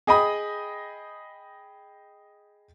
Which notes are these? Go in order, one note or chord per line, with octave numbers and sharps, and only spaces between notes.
G#4 D#5 G5 B5 D#6